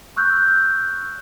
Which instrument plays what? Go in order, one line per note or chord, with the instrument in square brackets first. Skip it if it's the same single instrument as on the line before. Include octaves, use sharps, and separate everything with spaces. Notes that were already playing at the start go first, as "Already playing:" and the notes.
[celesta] C#6 E6 F#6 G6